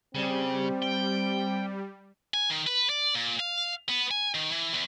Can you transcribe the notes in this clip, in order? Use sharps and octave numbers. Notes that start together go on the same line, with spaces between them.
C#3 G3 C4
G5
G#5
D#3
B4
D5
A#2
F5
B3
G#5
D#3
E3
E2